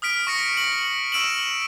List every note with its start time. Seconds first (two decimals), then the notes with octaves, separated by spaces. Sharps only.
0.02 D#6 F6 B6 D7
0.27 C#6 A#6 C#7
0.57 F#7
1.12 C#6 E6 D7 E7 F#7